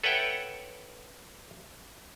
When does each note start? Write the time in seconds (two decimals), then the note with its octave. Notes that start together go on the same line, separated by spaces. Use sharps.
0.04 A4 B4 C#5 E5 F#5 G5